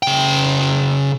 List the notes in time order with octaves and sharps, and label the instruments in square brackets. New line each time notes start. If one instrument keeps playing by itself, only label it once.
[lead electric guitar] C#3 G5